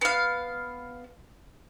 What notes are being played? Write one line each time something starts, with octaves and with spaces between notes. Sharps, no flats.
B3 F5